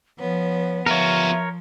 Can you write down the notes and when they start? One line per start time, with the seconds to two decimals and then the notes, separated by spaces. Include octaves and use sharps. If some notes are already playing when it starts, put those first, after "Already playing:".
0.19 F3 B3 C#5
0.86 F3 B3 F4 A#4 C#5 E5